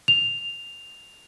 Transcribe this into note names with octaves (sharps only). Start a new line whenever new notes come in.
F7